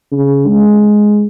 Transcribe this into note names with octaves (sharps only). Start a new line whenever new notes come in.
C#3
G#3